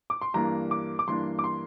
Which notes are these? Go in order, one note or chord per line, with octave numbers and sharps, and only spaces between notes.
D6
C6
G2 E3 A#3 D4 A#5
D6
D6
G2 E3 A#3 D4 C6
D6
C6